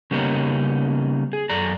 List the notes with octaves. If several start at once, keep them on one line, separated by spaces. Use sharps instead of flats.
C#3 G3 A#3 B3 C#4 D#4
G#4
F#2 A4 D5 A#5